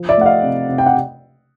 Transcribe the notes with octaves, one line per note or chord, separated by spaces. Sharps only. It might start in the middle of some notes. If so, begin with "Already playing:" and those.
Already playing: F3
D5 E5
A3 F#5
D#5 F5
C3
C3
G5
F#5